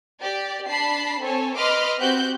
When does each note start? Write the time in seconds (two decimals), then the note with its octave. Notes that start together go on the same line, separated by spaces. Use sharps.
0.21 G4 D5
0.69 D4 A5 B5 C7
1.22 C4 A4 C#5 G#5
1.57 B4 D#5 B5 C6 D6 F6
2.00 C4 F#4 G4 F#6 G6